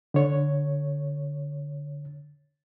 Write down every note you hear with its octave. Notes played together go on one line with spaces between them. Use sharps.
D3 C#5